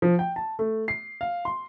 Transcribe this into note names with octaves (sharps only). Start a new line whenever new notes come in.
F3
G5
A5
A3
C7
F5
C6